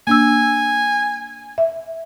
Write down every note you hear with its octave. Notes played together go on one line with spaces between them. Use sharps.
A#3 D4 G#5 E6
E5